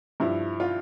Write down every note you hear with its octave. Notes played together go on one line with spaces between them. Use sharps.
G2 F3 E4
F4